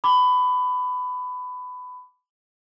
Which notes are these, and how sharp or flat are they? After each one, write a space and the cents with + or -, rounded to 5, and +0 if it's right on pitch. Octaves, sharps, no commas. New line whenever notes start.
B5 +20 D6 +0